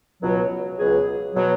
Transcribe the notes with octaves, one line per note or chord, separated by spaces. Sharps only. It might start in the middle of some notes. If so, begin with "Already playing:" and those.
C#2 B2 F#3
C#2 B2 F#3 G#4
B2 F#3